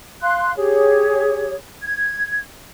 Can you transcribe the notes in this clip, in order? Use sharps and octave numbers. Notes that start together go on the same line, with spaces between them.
F5 C6 F#6
G4 G#4 C#5
G#6